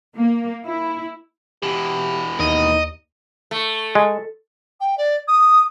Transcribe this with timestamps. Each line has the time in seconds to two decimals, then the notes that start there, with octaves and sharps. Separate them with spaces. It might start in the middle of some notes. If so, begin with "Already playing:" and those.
0.15 A#3
0.66 E4
1.63 B2 E3 G4
2.40 D#2 D#4 D#5
3.51 A3
3.95 G#3
4.80 G5
4.97 D5
5.27 D#6